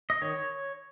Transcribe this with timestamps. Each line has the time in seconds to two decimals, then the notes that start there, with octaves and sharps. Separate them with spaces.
0.10 D#5
0.22 D#3 C#5